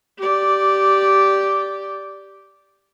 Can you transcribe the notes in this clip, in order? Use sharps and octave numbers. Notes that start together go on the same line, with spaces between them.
G4 D5